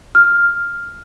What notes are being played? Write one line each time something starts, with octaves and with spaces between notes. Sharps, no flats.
F6